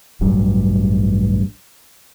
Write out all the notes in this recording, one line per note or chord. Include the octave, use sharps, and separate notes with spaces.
E1 A1 G2 F#3